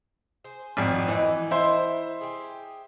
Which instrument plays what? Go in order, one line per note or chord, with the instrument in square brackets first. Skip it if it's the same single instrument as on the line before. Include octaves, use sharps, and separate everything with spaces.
[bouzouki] G#4 C5
[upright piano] G#1 F2 [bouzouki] A#3
[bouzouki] D#3 D#5 F#5 [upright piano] E3
[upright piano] E4 C5
[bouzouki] G4 G#4